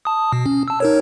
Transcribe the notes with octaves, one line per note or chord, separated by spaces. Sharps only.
A5 D#6
B2
C#4
A5 E6
D#4 A#4 C#5